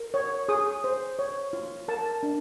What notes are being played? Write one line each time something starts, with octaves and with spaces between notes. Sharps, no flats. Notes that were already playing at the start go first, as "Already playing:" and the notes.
Already playing: A#4
C#5
G#4 D#6
C5
C#5
F4
A#4 A5
D4